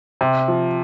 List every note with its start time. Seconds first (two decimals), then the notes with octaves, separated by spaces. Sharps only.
0.21 C3
0.48 F3